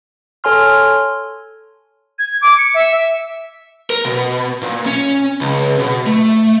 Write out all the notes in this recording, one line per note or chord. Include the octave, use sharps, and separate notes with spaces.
A4 C#5 G#5 C6 F6
G#6
D6
C#7
E5
A#4
B2
A#2
C#4
C#2
B2
A3